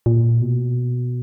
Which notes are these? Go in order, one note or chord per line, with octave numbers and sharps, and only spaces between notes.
A#2
B2